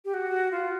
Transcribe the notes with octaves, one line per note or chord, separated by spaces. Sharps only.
G4
F#4
F4